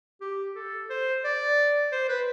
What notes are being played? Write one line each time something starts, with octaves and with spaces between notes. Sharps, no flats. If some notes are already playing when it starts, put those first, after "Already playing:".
G4
A4
C5
D5
C5
B4